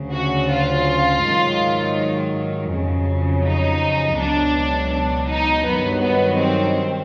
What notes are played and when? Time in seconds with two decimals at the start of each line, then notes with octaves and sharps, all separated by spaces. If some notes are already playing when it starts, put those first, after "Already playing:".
Already playing: D2 C#3 F#3
0.13 F#4
0.50 F4
1.23 G#2 D#3 F#3
2.71 F2 C#3 F#3
3.45 D#4
4.18 C#2 B2 F#3 D4
4.93 D4
5.29 D#4
5.66 G2 D#3 F#3 B3
6.03 B3
6.40 C4